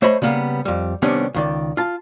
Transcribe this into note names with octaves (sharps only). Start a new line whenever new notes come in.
A3 C5 C#5 D#5 B5
C#3 G3 A#3 B3
F2 G3
C3 D#3 G3 B3 C#4 D4
C#2 D#3 D5
F4 A5